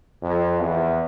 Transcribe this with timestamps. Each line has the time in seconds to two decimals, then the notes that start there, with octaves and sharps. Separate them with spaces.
0.22 F2
0.60 E2